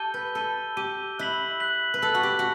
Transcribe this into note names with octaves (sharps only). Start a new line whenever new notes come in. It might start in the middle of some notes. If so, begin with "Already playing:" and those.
Already playing: G4 A4 E6 G6 D#7 G7
B4
A4 E6 G6 D#7 G7
G4 E6 G6 D#7 G7
E4 F#6 B6 F#7
F#6 B6 F#7
B4
A4 F#6 B6 F#7
F#4
G4
F#4